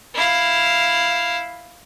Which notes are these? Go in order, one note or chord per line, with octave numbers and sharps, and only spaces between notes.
E4 F5